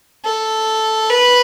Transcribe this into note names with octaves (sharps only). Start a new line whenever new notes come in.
A4
B4